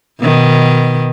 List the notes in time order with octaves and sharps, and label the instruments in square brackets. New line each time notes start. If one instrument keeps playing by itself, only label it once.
[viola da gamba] B2 D#3